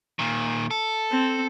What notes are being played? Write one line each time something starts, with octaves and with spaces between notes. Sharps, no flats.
A#2 D#3
A4
C4